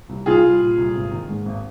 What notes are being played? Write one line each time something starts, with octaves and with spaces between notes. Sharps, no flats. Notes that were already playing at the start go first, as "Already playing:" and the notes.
C2
C2 F4 G#4
G3
A#2
C2
G#1
D#3
G#2
G#1